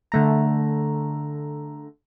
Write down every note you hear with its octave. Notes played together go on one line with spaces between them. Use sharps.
D3 A3 A#5